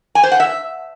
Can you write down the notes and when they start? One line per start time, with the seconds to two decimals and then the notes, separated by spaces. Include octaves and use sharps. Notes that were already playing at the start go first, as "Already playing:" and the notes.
0.15 G#5
0.23 C5
0.32 F#5
0.40 E5